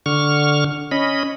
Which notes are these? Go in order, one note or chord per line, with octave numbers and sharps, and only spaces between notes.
D3 C#6 F6
C#4 D#5 B5